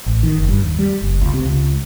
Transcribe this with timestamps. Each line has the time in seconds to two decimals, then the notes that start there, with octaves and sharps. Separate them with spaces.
0.06 A1
0.23 D#3
0.36 F#1
0.49 G2
0.62 D#2
0.79 G3
1.02 F#1
1.21 C#2
1.33 C3
1.45 C#2